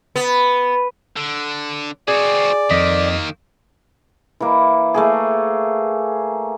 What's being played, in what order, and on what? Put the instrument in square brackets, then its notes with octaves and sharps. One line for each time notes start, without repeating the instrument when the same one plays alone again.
[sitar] B3
[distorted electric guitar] D3
[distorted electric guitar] C4 F#4 [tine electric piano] G#4 G#5 [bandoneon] D5
[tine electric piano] F2 D#5 B6 [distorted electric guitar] D#3 A#3
[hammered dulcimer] E3 A#3
A3 A#3 G#4